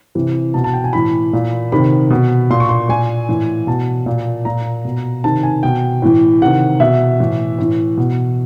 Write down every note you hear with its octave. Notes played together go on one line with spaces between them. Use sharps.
C3 E3
B2 A5
A5
G5
G#5
A2 E3 B5
A#2
C3 D#3 B5
B2
A#2 C6
C#6
C6
A#2 G#5
A2 E3
B2 A5
A#2
A#2 A#5
B2
C3 D#3 A5
G#5
B2 G5
A2 E3
C3 D#3 F#5
B2 E5
A2 E3
A2 E3
B2